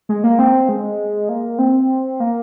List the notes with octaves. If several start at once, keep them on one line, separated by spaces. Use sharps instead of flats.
G#3
A#3
C4
G#3
A#3
C4
A#3